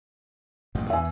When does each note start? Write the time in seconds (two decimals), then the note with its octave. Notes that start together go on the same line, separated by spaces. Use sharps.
0.75 A1 G2 A#2
0.90 E2 E3 E5 G#5